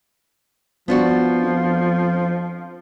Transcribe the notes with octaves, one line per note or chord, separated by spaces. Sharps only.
F3 B3 D4 F#4
F2